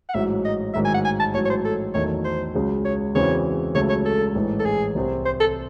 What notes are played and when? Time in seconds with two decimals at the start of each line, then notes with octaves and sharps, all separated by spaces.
0.09 F#5
0.14 A1 G#2 F#3 E5
0.45 D#5
0.74 A1 G#2 D#3 F#3 E5
0.85 G#5
0.94 F#5
1.05 G#5
1.20 A5
1.34 A1 G#2 F#3 C#5
1.45 C#5
1.50 C5
1.65 A4
1.94 E2 D#3 F#3 A3 C#5
2.24 C5
2.54 C#2 C#3 F#3
2.85 C#5
3.15 E2 C#3 E3 C4 F#4 C#5
3.75 C#2 C#3 F#3 A3 C#5
3.89 C#5
4.06 A4
4.35 A1 G#2 E3
4.59 A4
4.65 G#4
4.95 C2 C3 F#3 C4 F#4
5.25 C5
5.40 A4